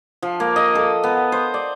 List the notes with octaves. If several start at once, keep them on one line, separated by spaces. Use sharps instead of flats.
F3
A#3
D#5
A4
B3
C5
D5